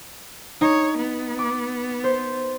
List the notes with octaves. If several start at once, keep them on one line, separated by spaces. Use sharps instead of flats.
D#4 C#5
B3
D6
C5